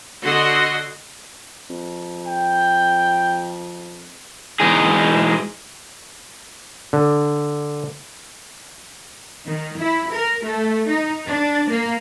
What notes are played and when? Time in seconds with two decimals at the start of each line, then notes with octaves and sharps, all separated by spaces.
0.23 D3 F#4 D#5 C6
1.70 F2
2.27 G5
4.60 E3 G#3 D#4 G#4
6.93 D3
9.46 D#3
9.78 E4
10.13 A#4
10.44 A3
10.89 D#4
11.26 D4
11.69 A#3